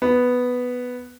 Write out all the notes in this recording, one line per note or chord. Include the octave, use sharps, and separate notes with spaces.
B3